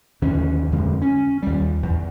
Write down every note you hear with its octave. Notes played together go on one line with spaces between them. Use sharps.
D#2 D3 C#4
F2 D3 G#3
C#4
D#2 G3
E2